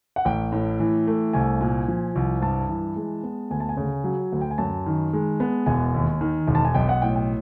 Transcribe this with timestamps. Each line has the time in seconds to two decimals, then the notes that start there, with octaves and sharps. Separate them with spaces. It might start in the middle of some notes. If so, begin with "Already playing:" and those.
0.16 F#5
0.25 A1 G5
0.52 A2
0.80 E3
1.07 A3
1.33 C2 G#5
1.61 A#2
1.88 F3
2.16 C2
2.42 G2 A5
2.69 E3
2.96 G#3
3.23 B3
3.50 D2 G#5
3.60 A5
3.69 G#5
3.77 C#3
4.04 F#3
4.32 D2
4.41 G5
4.51 G#5
4.58 F#2 A5
4.86 D#3
5.13 G#3
5.40 B3
5.66 E1 G#5
5.94 D#2
6.21 D#3
6.47 E1
6.55 A5
6.65 G#5
6.74 B1 G5
6.89 F#5
7.02 A2 G5
7.16 G5